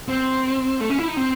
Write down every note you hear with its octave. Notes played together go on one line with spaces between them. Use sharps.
C4
A3
C#4
E4
D#4
C4